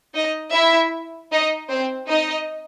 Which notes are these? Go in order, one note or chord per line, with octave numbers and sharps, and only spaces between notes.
D#4 D#5
E4 E5
D#4 D#5
C4 C5
D#4 D#5